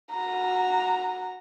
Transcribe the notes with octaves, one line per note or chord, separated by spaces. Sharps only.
F#4 A#5